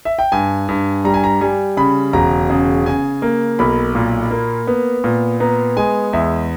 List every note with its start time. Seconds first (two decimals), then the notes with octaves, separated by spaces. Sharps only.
0.05 E5
0.19 G5
0.32 G2 G#5
0.69 G2
1.04 G3 A#5
1.14 G#5
1.24 A#5
1.41 G3 G#5
1.77 C#3 B5
2.13 E1 A#5
2.50 C#3
2.86 C#3 G#5
3.22 A#3
3.59 B1 B5
3.95 A#2
4.31 A#3
4.67 B3
5.04 A#2
5.40 B3 A#5
5.76 G#3 G#5
6.13 E2 E5